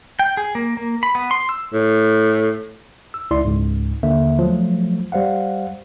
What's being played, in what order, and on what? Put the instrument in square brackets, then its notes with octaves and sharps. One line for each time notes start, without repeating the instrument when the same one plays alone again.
[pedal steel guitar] G5
G#4
A#3
A#3
B5
B3
C6
E6
[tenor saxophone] A2
[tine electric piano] E6
C#2 E4 D5 C6
C#2 G#2
D#2 D3 A#3 E5
F3 F#3 A3
G3 C5 F5 F#5